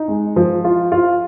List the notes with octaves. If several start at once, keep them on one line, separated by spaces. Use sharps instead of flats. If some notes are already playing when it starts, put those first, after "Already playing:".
Already playing: D#4
G#3
F3
F4
F4